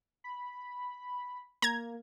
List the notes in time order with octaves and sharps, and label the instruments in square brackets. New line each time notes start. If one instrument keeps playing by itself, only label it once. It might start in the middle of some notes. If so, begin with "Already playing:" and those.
[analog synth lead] B5
[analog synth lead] A#3 [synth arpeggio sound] A#5 G#6